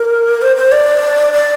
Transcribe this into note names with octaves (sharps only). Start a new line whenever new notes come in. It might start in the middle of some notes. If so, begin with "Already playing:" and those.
Already playing: A#4
C5
C5
D5
D5